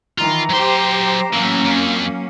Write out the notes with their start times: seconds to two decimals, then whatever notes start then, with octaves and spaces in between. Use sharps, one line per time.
0.18 D#3 E3 F4 A#5
0.50 F#3 G4 C5 C6
1.33 A2 E3 F#3 A#3 C#4
1.65 F2